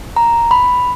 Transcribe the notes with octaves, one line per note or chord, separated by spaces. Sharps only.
A#5
B5